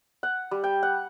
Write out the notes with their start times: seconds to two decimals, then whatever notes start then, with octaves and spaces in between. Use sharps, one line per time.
0.23 F#5
0.51 G3
0.64 G5
0.83 F#5